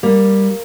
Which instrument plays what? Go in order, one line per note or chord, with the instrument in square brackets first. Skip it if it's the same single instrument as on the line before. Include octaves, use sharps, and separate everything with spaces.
[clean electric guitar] G3 [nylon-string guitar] A#3